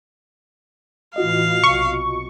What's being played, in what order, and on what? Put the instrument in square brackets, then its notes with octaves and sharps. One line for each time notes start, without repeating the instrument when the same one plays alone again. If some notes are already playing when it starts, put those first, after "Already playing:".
[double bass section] A2 E3 [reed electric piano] F4 F#4 D#5 [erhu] F5
[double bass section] B1 C3 [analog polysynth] C#6